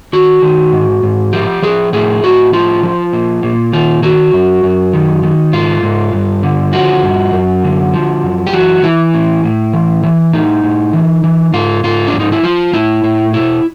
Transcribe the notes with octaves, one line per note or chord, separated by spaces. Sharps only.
D#3 F#4
D#3
G#2
G#2
F3 G4
F3 G#4
A2 G#4
A2 F#4
F3 F4
F3
A#2
A#2
D#3 F4
D#3 F#4
F#2
F#2
D#3
D#3
G#2 F4
G#2
G2
D3
F3 F#4
G2
F#2
D3
F3
F#2
G4
E3 F#4
E3 E4
A2
A2
E3
E3
A2 D#4
A2
E3
E3
G#2 F4
G#2 F4
D4
F3
D#4
E4
F3 F4
A2 E4
A2
B2 E4